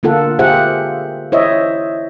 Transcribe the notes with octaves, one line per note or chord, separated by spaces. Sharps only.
D3 A#3 F4 A4 F#5
F4 G4 G#4 C5 E5 F#5
E4 C5 C#5 D#5 E5